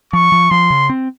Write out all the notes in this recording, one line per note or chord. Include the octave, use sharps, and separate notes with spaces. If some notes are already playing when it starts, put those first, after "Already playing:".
F3 C#6
F3
F3 C6
C#3
C4